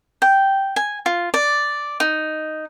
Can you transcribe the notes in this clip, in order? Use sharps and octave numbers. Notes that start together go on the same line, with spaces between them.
G5
G#5
F4
D5
D#4